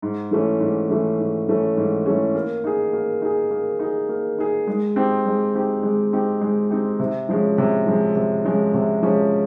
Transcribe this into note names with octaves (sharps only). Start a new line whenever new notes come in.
G#2
E3 A3 C#4
G#2
E3 A3 C#4
G#2
E3 A3 C#4
G#2
E3 A3 C#4
A#3
D#4 G#4
A#3
D#4 G#4
A#3
D#4 G#4
A#3
D#4 G#4
G#3
C4 D#4 G4
G#3
C4 D#4 G4
G#3
C4 D#4 G4
G#3
C4 D#4 G4
C3
F3 G#3 C#4
C3
F3 G#3 C#4
C3
F3 G#3 C#4
C3
F3 G#3 C#4